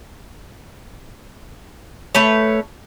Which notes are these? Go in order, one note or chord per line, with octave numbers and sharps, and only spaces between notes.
A3 B4 C#5